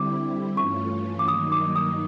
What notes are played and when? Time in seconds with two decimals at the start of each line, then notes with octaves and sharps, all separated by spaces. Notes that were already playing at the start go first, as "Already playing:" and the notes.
Already playing: D3 G3 C4 E4 D6
0.57 G2 E3 A3 C#4 F4 C#6
1.19 D6
1.28 G2 D#3 F#3 A#3 D#4 D#6
1.52 D6
1.76 D#6